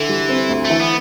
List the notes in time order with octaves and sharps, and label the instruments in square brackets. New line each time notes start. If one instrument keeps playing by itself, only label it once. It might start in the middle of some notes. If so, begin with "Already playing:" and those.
Already playing: [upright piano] D3 [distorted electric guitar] E3
[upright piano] G3
C4
D2
[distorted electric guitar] A3
[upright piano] E3
[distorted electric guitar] B3